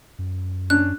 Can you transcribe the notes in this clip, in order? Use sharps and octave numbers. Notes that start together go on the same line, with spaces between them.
F#2
C#4 D4 F#6